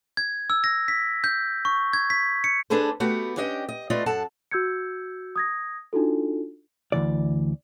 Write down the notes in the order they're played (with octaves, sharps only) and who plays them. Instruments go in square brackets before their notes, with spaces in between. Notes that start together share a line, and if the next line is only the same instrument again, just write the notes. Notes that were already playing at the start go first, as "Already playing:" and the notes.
[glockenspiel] G#6
E6
A#6
B6
G6
C#6
G#6
B6
C#7
[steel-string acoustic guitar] D4 G#4 A4 B4 C5
A3 B3 F#4 G4
C#4 D4 G4 D#5 F5 G5
D#5
A3 B3 F4 D5 D#5
F#2 A4 F#5 A5
[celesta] F#4 E6 G6 G#6 C#7
D#6 G#6 A#6
D4 D#4 F4 F#4 A4
[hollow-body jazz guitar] D2 C3 E3 D5